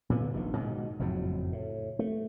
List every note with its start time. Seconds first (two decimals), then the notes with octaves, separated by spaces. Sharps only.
0.10 A#2 D3 B3
0.33 F1 A#1 C3 D#3
0.57 G#2 B2 D#3
0.99 F#1 F2 A2 F#3
1.53 A2
1.99 A3